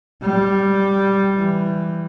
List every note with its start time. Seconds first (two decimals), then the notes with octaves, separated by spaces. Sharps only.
0.22 G3
1.36 E3